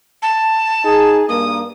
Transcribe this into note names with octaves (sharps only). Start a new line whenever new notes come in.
A5
D#4 G#4
G2 A#3 D#6